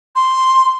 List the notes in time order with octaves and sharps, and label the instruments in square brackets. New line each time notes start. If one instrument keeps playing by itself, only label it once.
[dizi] C6